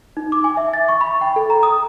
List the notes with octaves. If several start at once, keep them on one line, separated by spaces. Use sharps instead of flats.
D#4
D6
G#5
E5
A6
C#6
B5
G5
A4
A#5
D#6